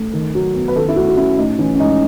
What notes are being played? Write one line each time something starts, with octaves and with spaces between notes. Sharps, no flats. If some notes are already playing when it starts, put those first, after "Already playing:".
Already playing: A3
D#3
F#3
B3
B4
D#3 A4
E4
A3 F#4
F#4
C#4 E4
A2 D#4
E3 C#4
C#4
G#3 D#4